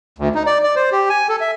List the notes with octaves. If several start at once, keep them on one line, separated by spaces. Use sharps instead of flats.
D2
D#4
D5
D5
C5
G4
G#5
A4
E5